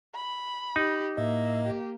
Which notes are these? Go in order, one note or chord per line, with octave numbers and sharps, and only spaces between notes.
B5
D#4 G4
A2 A#3 D#5 E5
G4